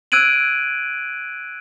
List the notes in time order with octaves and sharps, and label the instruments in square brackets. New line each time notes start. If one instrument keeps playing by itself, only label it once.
[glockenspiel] E6 F#6 G#6 D7 D#7 F#7